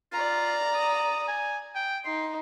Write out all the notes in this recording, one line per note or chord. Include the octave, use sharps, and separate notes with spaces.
F4 D5 A#5
D#6
G#5
G5
D#4 C6